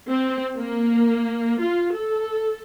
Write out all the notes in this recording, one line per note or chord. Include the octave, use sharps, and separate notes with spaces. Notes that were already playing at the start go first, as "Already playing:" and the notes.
C4
A#3
F4
A4